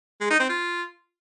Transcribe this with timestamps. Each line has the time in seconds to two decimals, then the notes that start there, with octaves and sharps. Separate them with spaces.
0.21 G#3
0.30 D#4
0.40 C4
0.49 F4